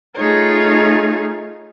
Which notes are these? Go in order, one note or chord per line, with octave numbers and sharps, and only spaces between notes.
A3 D#4 F4 G#4 C#5